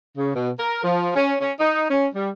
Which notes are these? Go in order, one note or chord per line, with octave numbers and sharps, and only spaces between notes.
C#3
B2
A#4
F3
C#4
C#4
D#4
C#4
G3